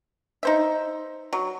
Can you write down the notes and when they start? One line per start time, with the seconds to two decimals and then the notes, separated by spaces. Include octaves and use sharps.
0.43 D#4 C5 E5
1.33 F#3